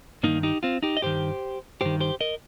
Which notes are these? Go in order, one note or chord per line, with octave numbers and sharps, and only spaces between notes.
G2 D#3 A#3 D#4
D#4 G4
C4 F4
D#4 G4
D#5
G2 D#3 G4 C5
G2 D#3 G4 C5
G4 C5
A#4 D#5